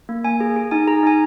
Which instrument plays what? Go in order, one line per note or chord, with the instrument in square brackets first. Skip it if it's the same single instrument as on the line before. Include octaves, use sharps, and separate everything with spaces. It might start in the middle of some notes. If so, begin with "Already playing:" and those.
[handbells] A#3
A#3 G#5
G#4
G#4
D#4 G#5
G#4 A#5
D#4 G#5